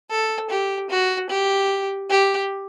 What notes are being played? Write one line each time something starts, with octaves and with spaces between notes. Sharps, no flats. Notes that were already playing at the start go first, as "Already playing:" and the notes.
A4
G4
F#4
G4
G4